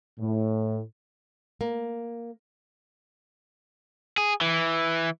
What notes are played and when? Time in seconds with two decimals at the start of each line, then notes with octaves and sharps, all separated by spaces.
0.20 A2
1.61 A#3
4.18 G#4
4.41 E3